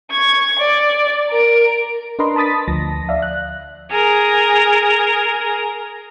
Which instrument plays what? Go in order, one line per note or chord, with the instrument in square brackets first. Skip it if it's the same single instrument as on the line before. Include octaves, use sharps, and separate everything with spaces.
[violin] C#6 G#6
D5
A#4 D7
[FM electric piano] D4 A#4 B4 D#5 A#5 C6
A5 B5 D#6 A6 B6
D2 F3 A5 A#6
D5 E5 F5
F#6
[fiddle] G#4 A#4